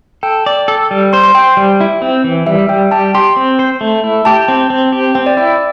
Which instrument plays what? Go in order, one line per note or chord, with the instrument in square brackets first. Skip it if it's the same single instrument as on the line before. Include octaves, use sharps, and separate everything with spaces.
[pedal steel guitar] A4 [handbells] G5
[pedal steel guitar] D5
A4
G3
[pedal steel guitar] C5 [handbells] C6
[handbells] C6
[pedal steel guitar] C5 [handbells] G5
[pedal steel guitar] G3
E4
C4
E3
[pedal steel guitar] G3 [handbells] E5
[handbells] E5
[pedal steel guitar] G3 [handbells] G5
[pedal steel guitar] G4 [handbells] A5
[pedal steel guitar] G4 [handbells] C6
[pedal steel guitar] C4
C5
A3
E4
[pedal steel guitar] G4 [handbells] A5
[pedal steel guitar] C4
C4
G4
[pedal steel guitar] C4 [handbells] G5
[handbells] D5
[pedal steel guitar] E4 [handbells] D5